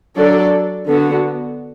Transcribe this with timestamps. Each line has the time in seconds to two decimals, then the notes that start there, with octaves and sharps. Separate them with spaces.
0.17 F#3 D4 A4 D5
0.88 D3 B3 F#4